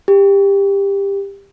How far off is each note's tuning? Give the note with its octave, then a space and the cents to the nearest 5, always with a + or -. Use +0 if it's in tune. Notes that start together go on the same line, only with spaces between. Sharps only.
G4 +20